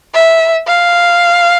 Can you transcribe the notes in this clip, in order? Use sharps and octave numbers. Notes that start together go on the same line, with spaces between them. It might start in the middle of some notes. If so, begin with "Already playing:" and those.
E5
F5